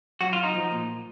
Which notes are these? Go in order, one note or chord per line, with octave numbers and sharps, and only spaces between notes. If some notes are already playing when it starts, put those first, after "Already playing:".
F#3 F#4
F4
F#3
D#4
F3
A#2